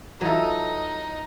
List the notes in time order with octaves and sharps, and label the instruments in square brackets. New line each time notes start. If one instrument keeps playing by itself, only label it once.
[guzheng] E3 A4 [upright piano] F#3 F4 [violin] D#4